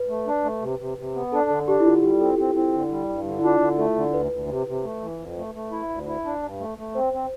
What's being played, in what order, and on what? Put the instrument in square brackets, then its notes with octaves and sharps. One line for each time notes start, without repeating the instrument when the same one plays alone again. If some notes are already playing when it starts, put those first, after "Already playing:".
Already playing: [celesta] B4
[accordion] A3
D4
A3
C3
C3
C3
B3
[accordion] D4 [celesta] A4
[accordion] D3 [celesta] A4
[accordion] D4 [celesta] G4
[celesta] E4
[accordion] D3 [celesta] F4
[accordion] G3 [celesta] G4
[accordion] C4 [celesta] A4
[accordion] C4 [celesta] G4
[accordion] C4 [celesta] E4
[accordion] D3
G3
G2
D3
[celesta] E4
[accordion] D4 [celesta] F4
[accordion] D3
[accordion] A3 [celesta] A4
[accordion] D3
[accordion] D2 [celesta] B4
[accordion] D2
C3
C3
A3
E3
F2
A3
A3
E4
D2
E4
D4
G2
A3
A3
[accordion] C4 [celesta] C5
[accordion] C4